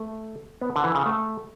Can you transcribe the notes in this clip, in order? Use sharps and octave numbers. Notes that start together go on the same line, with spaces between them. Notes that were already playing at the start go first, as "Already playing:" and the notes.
Already playing: A3
B3
D3
E3
C#3
A3